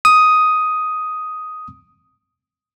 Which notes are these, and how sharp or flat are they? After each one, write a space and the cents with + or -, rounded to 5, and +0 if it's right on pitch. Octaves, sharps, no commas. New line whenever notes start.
D#6 +5